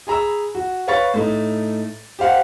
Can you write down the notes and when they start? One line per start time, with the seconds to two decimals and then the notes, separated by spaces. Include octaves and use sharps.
0.07 G#4 G#5 A#5 B5 E6
0.55 F#4
0.88 B4 C#5 F5 B5 C#6 A6
1.14 A2 A3 D#4
2.19 G4 C5 F5 F#5